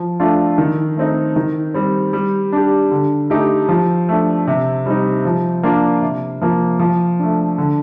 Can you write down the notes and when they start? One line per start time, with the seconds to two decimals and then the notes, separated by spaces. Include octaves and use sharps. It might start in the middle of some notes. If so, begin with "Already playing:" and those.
Already playing: F3
0.20 A3 D4 F4
0.58 D#3
0.97 A3 C4 D#4
1.36 D#3
1.74 G3 C4
2.13 G3
2.52 D4 G4
2.91 D3
3.30 A3 D#4 G4
3.69 F3
4.09 A3 D4
4.47 C3
4.86 G3 C4 D#4
5.25 F3
5.63 A#3 D4 F4
6.02 C3
6.42 F3 A#3
6.79 F3
7.19 A3 D4
7.58 D3